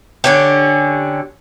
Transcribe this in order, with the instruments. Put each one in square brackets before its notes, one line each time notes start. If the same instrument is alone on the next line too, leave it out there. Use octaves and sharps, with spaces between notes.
[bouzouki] D3 C#4 G4